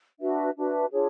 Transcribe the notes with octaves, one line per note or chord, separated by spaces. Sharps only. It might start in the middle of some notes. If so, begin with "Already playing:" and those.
D4 F#4 B4 E5
D4 F#4 B4 E5
D4 F4 G#4 C#5